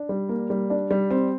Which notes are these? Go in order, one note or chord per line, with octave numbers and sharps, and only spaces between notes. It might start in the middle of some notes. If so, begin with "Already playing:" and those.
Already playing: D4
G3
A#3
G3
D4
G3
C4